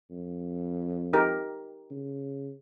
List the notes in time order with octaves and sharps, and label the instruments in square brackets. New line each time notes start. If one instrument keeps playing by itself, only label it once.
[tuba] F2
[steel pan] D#4 G4 A#4
[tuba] C#3